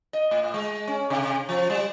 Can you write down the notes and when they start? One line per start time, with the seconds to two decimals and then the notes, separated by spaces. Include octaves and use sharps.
0.13 D#5
0.31 A2
0.54 G#3
0.87 C#4
1.10 C3
1.49 F3
1.70 G3